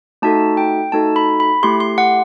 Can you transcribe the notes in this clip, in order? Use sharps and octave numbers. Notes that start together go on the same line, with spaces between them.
A3 D#4 F#4 A4 A5
G5
A3 D#4 F#4 A4 A5
B5
B5
A3 E4 G4 C6
C6
F#5